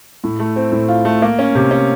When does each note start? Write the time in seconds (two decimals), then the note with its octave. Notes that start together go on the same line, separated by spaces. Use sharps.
0.24 A2
0.40 A3
0.56 C4
0.72 A2
0.88 F4
1.05 A3
1.22 A#3
1.39 C#4
1.55 C3
1.71 C#4